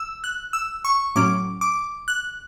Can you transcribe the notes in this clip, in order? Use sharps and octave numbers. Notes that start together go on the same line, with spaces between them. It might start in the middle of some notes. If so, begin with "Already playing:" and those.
Already playing: E6
F#6
E6
C#6
A2 F#3 C#4 D6
D6
F#6